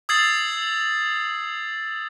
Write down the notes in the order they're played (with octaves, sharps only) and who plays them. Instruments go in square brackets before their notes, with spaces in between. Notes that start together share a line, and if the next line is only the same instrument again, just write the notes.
[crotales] D#6 E6 G#6 A6 C7 F#7